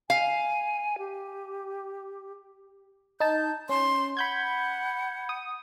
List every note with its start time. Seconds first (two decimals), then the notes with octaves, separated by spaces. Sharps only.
0.10 F5 G#5
0.98 G4
3.20 D#4 A5 G6
3.69 C#4 C6
4.17 F#5 B5 G6 G#6
5.29 D#6